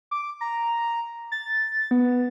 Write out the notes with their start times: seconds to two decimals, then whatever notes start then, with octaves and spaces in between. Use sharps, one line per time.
0.11 D6
0.41 A#5
1.32 A6
1.91 B3